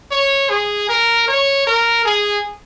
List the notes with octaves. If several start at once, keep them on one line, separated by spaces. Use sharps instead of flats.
C#5
G#4
A#4
C#5
A#4
G#4